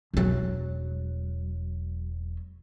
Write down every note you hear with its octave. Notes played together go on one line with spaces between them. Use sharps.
E1 F#3